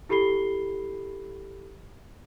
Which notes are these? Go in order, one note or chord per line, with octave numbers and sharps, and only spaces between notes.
E4 G4 A4 B5 C7 G7